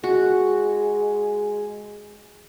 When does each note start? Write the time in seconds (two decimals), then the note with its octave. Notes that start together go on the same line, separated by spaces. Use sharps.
0.04 G#3 F#4